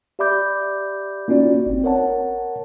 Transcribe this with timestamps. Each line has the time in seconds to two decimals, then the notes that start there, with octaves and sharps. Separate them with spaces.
0.19 G4 D5 E5 B5 D6 G6
1.28 A#3 C#4 D#4 F4 F#4 D5
1.66 G1 C4
1.84 A#4 C#5 F#5 A5